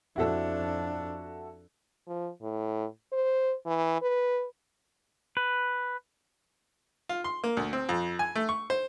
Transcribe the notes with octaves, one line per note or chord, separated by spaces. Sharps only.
F2 D4 E4 F#4 A4
F3
A2
C5
E3
B4
B4
F4
C6
A#3
D2
C4
F2
G#5
A3
C#6
C5